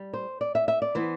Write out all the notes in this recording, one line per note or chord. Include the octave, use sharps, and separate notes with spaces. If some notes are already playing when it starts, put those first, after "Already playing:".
Already playing: G3
C5
D5
E5
E5
D5
E3 B3 C5